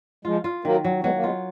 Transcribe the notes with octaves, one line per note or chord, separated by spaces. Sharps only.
F3 G#3 F4
F4
D#3 F#3 A#3
F#3
F#3 G#3 B3
A#3
G#3 B3 F4